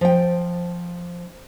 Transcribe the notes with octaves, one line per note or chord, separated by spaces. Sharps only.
F3 G5